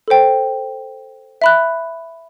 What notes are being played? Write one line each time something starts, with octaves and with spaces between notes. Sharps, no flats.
A4 C5 G5
E5 B5 F#6